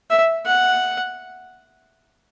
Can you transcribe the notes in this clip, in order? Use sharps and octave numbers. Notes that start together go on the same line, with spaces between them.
E5
F#5